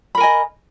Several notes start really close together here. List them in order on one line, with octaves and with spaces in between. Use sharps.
B5 A#4 G#5 D#5